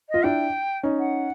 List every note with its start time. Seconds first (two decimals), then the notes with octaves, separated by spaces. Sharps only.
0.09 D#5
0.14 F4
0.24 D4 E4 G5
0.83 C#4 D#4
0.98 F#5